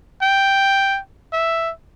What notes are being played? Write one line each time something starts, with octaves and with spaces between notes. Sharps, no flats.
G5
E5